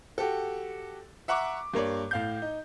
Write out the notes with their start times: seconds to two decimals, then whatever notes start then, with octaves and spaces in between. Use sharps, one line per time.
0.18 F#4 G4 A4
1.28 E5 F#5 A#5 C#6 D6
1.74 G2 A#3 C#5 D5
2.11 A2 F5 G6
2.42 D#4